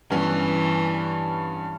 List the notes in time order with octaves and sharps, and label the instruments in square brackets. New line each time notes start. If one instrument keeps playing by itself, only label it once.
[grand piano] G2 B3 C#4 [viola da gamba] E3